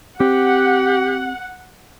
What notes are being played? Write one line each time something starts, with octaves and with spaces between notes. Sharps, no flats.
C4 G4 F#5